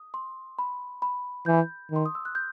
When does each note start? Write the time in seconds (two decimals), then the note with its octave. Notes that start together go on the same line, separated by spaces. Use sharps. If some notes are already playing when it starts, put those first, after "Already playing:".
Already playing: D#6
0.14 C6
0.59 B5
1.02 B5
1.46 E3 G6
1.91 D#3
1.96 C6
2.06 D#6
2.15 E6
2.25 F#6
2.35 G6